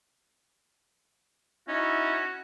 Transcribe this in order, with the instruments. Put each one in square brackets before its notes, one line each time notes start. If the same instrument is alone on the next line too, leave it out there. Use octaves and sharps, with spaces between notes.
[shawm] C#4 [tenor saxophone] D#4 [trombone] E4 [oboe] F#4